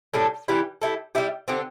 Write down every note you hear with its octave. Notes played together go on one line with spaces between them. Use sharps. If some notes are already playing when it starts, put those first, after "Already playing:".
A2 G3 D4 A4
E3 G3 E4 G4
G3 E4 A4
G3 E4 G4
D3 C4 G4